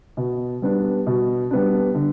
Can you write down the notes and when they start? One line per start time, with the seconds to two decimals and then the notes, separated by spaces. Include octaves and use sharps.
0.17 B2
0.62 G3 B3 D4
1.07 B2
1.51 G3 B3 D4
1.95 D3